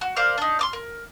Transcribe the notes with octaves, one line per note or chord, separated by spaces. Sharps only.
F#4
A#4 C5 D5 F5
D4 D#4
C6 D6 F6
A#4